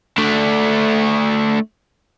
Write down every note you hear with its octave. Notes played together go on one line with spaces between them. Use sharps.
A3 D4